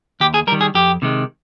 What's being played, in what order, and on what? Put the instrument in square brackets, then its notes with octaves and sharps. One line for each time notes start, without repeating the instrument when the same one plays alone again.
[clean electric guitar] D#2 G4
G#4
G3 A#4
D#3
G#4
F2 G4
C3 D#3 G#3